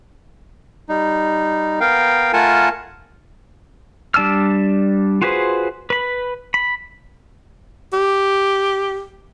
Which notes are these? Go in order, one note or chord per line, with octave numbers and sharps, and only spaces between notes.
G3 D#4
B3 A#4 F5 G5
A3 F4 A#4 F#5 G#5 A5
G3 D4 A5 E6 F6
F4 F#4 G#4 B4 C5
B4 B5
B5
G4